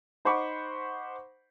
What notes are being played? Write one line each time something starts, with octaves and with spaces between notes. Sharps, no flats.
D#4 C5 F#5 B5 C#6 D6